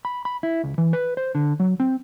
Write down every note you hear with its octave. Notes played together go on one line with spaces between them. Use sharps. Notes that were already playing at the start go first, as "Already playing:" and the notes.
B5
B5
E4
C#2
E3
B4
C5
D3
F#3
C4